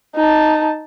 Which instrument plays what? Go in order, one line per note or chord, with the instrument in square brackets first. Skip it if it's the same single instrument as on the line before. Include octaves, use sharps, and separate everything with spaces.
[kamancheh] D#4 A5